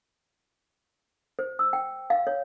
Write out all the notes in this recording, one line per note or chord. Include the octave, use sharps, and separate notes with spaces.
C5
E6
G5
F5
C#5